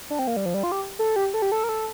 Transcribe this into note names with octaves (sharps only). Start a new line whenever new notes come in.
D4
C4
A#3
G3
F3
G3
F4
G4
A4
G4
A4
G4
A4
A#4
A4